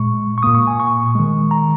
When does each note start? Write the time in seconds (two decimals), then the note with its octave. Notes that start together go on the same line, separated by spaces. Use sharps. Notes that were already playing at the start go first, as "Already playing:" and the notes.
Already playing: A#2 G#3 C#6
0.38 C#6
0.43 A#2 A#3 D#6
0.55 C#6
0.67 G#5
0.80 C#6
1.15 D#3 G#3
1.51 A#5